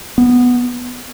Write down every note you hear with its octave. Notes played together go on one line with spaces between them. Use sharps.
B3